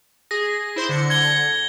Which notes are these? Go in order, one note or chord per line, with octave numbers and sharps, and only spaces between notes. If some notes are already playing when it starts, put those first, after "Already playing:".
G#4 A#6
E4 C5 C6
D3 C#7
G#6 G7